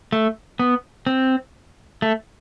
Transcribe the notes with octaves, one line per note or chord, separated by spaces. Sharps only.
A3
B3
C4
A3